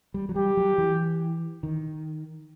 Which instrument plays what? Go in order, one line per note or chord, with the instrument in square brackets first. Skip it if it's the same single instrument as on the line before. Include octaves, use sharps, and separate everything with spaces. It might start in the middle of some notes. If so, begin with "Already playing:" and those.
[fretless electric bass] G3
F#3
[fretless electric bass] G3 [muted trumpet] G4
[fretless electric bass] F#3
E3
D#3